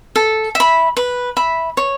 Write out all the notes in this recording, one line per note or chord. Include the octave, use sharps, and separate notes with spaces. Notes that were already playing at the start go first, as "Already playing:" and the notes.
A4
E5 B5
B4
E5 B5
C#5